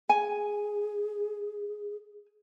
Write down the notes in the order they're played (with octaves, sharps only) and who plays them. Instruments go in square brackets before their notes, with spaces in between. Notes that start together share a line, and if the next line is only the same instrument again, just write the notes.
[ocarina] G#4 [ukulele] G#5